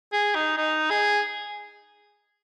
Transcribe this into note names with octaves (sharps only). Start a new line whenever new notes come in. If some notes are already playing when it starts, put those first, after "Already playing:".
G#4
D#4
D#4
G#4